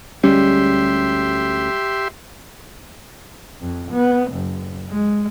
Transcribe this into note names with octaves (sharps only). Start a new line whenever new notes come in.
D2 G3 G#3 C#4 G4 E5 C6
F2
B3
F#1
G#3